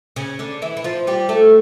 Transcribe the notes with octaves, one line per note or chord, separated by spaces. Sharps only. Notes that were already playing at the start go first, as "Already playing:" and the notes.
C#3 C#4
D3 D4
E3 E4
E4
F3 F4
G3 G4
A3 A4